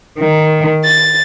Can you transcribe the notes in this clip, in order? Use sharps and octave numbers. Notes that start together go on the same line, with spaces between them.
D#3
A6